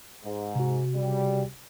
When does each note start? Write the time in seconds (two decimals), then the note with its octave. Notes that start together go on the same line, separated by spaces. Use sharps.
0.24 G#2
0.55 C3 F#4
0.95 C#3 G3